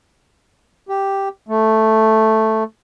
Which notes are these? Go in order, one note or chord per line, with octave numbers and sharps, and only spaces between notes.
G4
A3